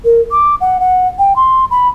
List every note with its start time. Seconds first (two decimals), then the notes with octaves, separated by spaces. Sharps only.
0.05 A#4
0.31 D6
0.61 F#5
0.80 F#5
1.19 G5
1.36 C6
1.71 B5